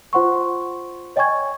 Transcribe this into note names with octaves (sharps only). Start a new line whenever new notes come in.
F4 C5 F#5 C6 C#6
C#5 D#5 G5 G#5 C#6 G#6